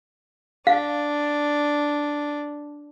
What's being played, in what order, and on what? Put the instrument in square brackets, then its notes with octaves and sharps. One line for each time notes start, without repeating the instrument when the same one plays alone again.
[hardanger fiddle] D4 [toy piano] F5